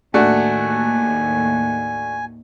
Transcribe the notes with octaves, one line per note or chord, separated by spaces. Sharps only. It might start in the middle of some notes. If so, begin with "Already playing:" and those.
D#2 A2 A3 D4 F#4 G#5